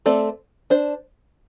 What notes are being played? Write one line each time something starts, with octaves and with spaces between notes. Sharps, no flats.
A3 C4 A4 D5
D4 C5